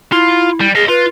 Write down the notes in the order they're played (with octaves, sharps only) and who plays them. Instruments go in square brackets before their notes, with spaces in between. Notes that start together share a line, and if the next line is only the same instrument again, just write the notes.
[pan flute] E4 [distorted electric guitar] F4
[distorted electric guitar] G3
[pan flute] G#4 [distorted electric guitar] D#5 F5
[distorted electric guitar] F4 [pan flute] B4